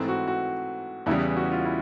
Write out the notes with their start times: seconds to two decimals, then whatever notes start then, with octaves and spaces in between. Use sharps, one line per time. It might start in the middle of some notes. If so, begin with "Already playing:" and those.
Already playing: G#2 E3 A3 C4
0.08 F#4
0.27 F#4
1.06 E2 C#3 E3 G3 E4
1.36 F#4
1.52 F4
1.65 E4